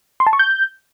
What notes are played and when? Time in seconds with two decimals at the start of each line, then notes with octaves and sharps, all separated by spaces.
0.20 C6
0.27 A5
0.33 C#6
0.39 G6